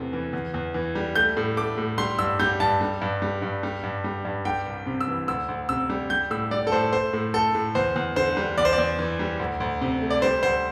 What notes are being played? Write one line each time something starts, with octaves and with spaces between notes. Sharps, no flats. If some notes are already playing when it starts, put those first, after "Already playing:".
Already playing: E2 C3 E3 A3
E3
E2
E2
E3
G3
A3 G6
A2
A3 D6
A2
G3 C6
G2 E6
G3 G6
G2 A5
G3
G2
G3
G2
G3
G2
G3
G2
G3 G5
C2
C3
E6
E3
D2 E6
D2
C3 E6
G3
G3 G6
A2 E6
G3 D5
A4
A2 C5
A3 C5
A2
A3 A4
A2
E2 C5
E2
D3 C5
G3
E2 D5
C5
D5
E2
E3
G3
D2
D2
C3
A3
D5
G3 C5
D2 C5